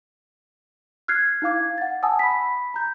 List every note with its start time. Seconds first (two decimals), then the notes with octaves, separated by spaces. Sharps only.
1.08 F6 F#6 G#6 C7
1.42 D#4 E4 F5 D6 G#6
1.78 F#5 A6
2.03 F#5 G#5 A5 D#6 E6
2.19 B5 B6
2.74 A#5 G6